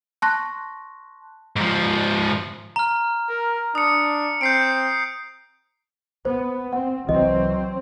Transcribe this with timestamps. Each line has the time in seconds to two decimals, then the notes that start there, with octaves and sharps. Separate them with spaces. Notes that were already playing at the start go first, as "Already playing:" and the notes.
0.22 A5 C6 C#6 F#6 A#6
1.56 G#2 F3
2.76 A#5 F6
3.29 A#4
3.75 D4 D#6 C#7
4.41 C4 G6 C7 D7
6.25 B3 C5
6.73 C4 F#5
7.09 C2 E3 F#3 C4 D#5